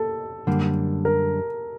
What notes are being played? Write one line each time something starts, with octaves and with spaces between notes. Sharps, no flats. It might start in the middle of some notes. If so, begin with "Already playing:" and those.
Already playing: A#3 A4
F#2 D3 G3 A#3
A#4